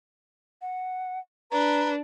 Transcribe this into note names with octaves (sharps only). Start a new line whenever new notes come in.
F#5
D4 B4 A#5